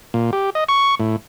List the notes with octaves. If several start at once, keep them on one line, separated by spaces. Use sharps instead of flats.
A#2
G4
D#5
C#6
A2